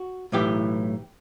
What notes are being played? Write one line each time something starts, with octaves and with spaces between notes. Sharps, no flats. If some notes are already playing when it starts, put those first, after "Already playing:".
Already playing: F#4
B1 A2 E3 G4